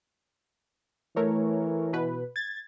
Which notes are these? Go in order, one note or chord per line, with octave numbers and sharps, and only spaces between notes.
E3 A3 A#4 C#5
B2 B4
G#6 A6